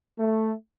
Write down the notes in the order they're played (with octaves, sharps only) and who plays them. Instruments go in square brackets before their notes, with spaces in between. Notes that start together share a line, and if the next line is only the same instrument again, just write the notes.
[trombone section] A3